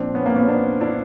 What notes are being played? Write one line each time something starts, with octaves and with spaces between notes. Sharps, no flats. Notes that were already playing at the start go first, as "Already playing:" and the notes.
Already playing: A#2 F3 C4 D4
B3 C#4
A#3 C4
B3 C#4
C4 D4
D4 E4